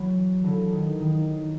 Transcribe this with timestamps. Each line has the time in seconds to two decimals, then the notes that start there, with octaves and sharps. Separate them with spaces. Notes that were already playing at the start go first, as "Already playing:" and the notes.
Already playing: E3 F#3
0.44 D3 E3
0.72 D#3
1.00 D#3